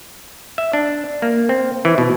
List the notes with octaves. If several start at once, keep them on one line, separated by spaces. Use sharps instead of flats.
E5
D4
A#3
C4
E3
B2